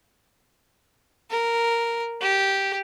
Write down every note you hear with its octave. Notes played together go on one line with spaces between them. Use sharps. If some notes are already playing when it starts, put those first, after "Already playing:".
A#4
G4